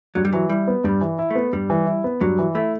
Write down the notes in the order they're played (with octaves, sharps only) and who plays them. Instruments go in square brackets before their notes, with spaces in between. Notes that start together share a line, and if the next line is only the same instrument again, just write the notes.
[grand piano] G2 [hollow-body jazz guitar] F#3
[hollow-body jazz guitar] G3
[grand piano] E3 [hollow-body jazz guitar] F#3
[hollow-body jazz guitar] G3 [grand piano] E4
[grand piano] B3
[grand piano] G2 [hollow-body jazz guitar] G3
[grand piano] E3
E4
[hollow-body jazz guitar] A3 [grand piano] B3
[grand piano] G2 [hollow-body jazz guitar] G3
[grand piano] E3
E4
B3
[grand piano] G2 [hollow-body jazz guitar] F#3
[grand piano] E3
[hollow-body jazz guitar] A3 [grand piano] E4